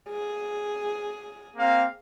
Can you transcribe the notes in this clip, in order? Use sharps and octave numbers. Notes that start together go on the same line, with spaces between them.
G#4
A#3 C4 F5